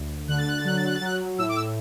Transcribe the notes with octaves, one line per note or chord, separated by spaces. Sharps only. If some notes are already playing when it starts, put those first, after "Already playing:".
Already playing: D2
D3 F#6
A6
F#6
A6
F#3 F#6
A6
F#6
A6
F#3 F#6
A2 E6
D6
E6